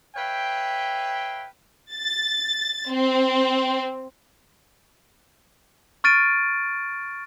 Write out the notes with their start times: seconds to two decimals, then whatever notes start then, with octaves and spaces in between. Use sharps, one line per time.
0.15 B4 C#5 E5 F5 G5
1.93 A6
2.90 C4
6.04 C#6 F6 A6 D7 D#7